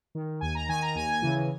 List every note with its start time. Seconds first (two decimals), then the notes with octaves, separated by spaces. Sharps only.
0.15 D#3
0.41 D#2 G#5
0.55 A#5
0.69 D#3 G#5
0.82 A#5
0.95 D#2 G#5
1.22 C#3 E3